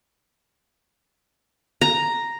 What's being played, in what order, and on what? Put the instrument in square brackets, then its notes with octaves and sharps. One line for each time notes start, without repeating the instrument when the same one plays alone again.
[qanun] A#5